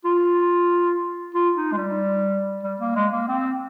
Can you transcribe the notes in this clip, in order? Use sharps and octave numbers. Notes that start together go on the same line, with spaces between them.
F4
F4
D#4
G#3
G3
G3
A#3
G#3
A#3
C4